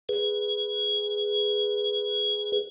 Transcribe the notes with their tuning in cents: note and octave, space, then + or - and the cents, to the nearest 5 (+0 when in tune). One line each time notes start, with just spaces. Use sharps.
G#4 +0 B4 +0